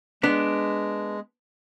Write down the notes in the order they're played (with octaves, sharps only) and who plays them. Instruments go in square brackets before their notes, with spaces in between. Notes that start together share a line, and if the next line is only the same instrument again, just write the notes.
[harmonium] G#3 [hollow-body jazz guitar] B3 D4